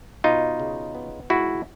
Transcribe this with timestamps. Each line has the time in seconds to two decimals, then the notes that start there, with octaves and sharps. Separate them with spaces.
0.24 B2 D#4 F4
0.60 C#3
0.95 B3
1.30 G#2 E4 F#4